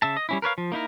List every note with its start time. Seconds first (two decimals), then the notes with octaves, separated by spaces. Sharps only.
0.02 C#3 E5 A5
0.17 D#5
0.29 G3 C#4 E4
0.42 A#4 B4 C#5 F5
0.58 F3
0.72 A#3 D#4 E4 A#4